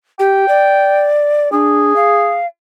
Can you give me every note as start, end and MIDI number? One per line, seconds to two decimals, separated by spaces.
0.19 0.45 67
0.19 1.08 79
0.48 1.51 74
1.52 1.96 62
1.52 2.38 68
1.96 2.46 77